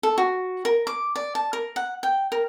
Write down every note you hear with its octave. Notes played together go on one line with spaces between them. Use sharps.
A4
F#4
A#4
D6
D5
A5
A#4
F#5
G5
A#4